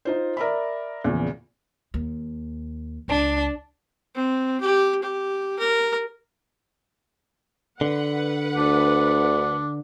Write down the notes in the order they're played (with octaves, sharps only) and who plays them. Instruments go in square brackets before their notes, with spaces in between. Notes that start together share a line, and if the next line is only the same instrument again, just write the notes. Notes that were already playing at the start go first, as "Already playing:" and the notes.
[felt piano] D#4 F4 C5
A#4 D5 E5 B5
E2 A#2 C#3 F3
[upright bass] D#2
[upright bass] C#2 [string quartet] D4
[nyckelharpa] C4
G4
G4
A#4
[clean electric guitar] D3 [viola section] B4 F#5
[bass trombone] D2 [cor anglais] D4